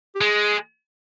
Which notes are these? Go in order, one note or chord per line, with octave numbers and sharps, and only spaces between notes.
G4
G#3 G#4